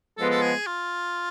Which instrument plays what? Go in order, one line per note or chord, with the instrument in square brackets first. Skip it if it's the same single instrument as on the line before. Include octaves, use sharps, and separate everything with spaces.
[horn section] F3 G#3 B3 [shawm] A4
[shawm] A4
G#4
F4